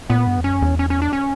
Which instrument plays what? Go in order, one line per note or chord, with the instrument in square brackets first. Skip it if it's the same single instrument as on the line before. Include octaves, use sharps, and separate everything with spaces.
[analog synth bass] A#2 [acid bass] B3
[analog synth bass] G2
E2
[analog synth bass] F#2 [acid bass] C#4
[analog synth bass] E2
[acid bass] C#4
C#4
D4
C#4